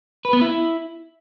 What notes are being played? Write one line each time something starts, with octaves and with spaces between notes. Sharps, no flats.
B4
B3
E4